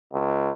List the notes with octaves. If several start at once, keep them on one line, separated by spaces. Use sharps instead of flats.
C#2